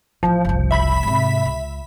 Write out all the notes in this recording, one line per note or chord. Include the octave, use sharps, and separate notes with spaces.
A1 E3 F3
F#1 C2
E5 B5 B6
G#2 C3
C#2